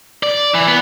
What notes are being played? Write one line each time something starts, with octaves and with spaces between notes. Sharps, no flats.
D5
E3
B3